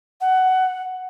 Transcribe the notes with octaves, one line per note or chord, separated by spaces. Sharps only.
F#5